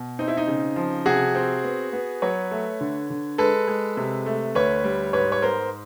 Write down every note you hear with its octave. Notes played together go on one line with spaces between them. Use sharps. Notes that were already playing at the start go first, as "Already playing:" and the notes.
Already playing: B2
C4 D#4
E4
D#4
C#3
F3
C3 F#4 G#4
C4
B3
B3
F#3 B4 C#5
A3
D3
D3
G#3 A4 B4
G#3
C3
A3
D2 B4 C#5
G3
G#2 B4 C#5
C#5
B3 A#4 C5